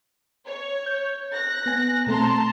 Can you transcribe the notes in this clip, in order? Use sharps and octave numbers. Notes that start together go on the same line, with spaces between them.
C#5
G6
F#6 A#6
B3 G#5
B2 A3 C4 A5 A#5 C6